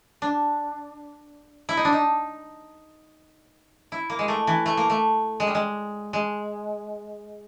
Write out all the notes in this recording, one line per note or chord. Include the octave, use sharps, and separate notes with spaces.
D4
E4
D#4
D4
D#4
E4
A#3
G#3
A3
E3
A3
A#3
A3
G#3
G3
G#3
G#3